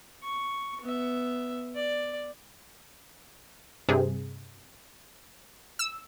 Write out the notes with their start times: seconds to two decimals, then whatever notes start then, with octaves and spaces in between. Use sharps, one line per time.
0.23 C#6
0.81 B3 E5
1.75 D5
3.89 G2 C3 G#4
5.79 E6